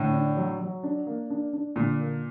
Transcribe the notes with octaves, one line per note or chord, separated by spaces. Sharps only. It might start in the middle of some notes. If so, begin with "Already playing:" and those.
Already playing: A2 D3
D4
F#3
F#3
D4
A#3
D4
D4
A#2 D3
A#3